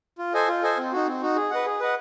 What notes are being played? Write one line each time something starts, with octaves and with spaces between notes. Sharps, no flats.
F4
A4 C5 D#5 G#5
F4
A4 C5 D#5 G#5
C4
D#4 F#4
C4
D#4 F#4
G#4
B4 D#5 F#5
G#4
B4 D#5 F#5